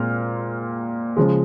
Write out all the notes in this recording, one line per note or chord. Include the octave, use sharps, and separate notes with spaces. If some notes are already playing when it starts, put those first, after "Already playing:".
Already playing: A#2 G#3 C4 F6
C#3 F3 G#3